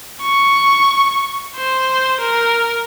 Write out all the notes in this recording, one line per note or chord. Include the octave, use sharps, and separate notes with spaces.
C#6
C5
A#4